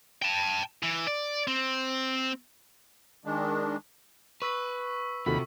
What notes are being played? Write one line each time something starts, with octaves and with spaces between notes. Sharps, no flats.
G5 A5
E3
D5
C4
D#3 G#3 D4
B4 C#6 E6 B6
D#2 C3 F4 F#4 A4 B5